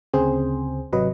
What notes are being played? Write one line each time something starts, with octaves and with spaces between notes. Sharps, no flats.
D2 C#3 C4 G#4 C5
G#1 C3 F#3 B4 D#5